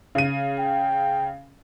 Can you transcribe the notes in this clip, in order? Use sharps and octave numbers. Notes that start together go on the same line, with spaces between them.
C#3 D#7
G5